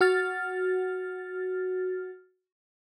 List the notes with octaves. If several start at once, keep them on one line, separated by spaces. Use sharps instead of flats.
F#4 F6 A6